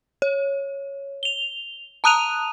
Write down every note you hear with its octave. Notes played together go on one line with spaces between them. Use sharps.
C#5
F7 G7
A5 A#5 D#6 F#6 D#7 F7